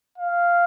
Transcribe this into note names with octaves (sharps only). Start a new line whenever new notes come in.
F5